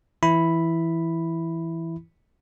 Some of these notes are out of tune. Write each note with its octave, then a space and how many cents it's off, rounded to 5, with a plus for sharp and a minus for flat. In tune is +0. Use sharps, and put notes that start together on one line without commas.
E3 +0 E4 +0 B5 +0